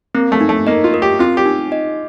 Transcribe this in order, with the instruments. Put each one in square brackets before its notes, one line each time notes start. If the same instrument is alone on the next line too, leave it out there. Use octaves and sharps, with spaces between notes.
[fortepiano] A#3 [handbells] C4
[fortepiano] A3
[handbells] D#4
[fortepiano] A3
[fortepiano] A#3 [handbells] D#5
[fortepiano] F4
[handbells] A#4
[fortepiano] G4
[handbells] C4 [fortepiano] F4
[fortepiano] G4
[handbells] D#4
D#5